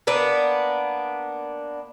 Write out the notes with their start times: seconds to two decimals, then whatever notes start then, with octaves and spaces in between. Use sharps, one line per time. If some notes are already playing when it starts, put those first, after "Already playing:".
0.07 A#3 B3 D4